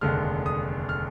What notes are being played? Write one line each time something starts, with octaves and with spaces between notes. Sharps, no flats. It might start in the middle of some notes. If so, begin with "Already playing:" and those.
F1 D#2 D3 G#3 F6
D#6
F6